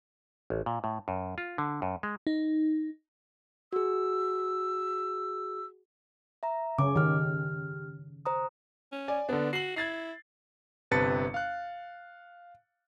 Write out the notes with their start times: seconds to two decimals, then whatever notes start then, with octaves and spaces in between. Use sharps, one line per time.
0.50 A1
0.66 A#2
0.84 A2
1.08 F#2
1.38 F4
1.58 D3
1.82 F#2
2.03 G#3
2.27 D#4
3.73 F#4 G#4 E6
6.43 E5 A#5
6.79 C#3 C#4 D6
6.96 D#3 G4 F6
8.25 C5 A#5 D#6
8.92 C#4
9.08 D5 G#5
9.29 D3 B3 D4
9.53 F#4 C7 F#7
9.76 E4 G#6 A6 C7
10.91 G1 C3 B4 A5 A6 C#7
11.34 F5 F#6